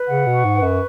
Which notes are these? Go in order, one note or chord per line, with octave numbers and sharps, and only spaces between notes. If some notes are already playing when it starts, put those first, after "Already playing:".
Already playing: B4
C#3 F#5
B2
C#6
G#2
B4
F#2